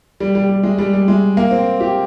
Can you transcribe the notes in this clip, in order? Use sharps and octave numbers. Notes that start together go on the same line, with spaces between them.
G3
G3
G3
G#3
G3
G3
G#3
A#3
C4
G4